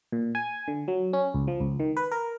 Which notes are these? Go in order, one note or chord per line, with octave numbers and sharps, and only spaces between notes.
A#2
G#5
D3
F#3
C#4
C#2
F3
C#2
D#3
B4
A#4